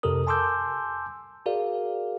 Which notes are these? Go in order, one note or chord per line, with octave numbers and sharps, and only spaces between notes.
F2 C3 G4 A4 A#4 D#6
G#5 A5 C6 D6 E6 G6
F#4 G#4 A#4 D5 F5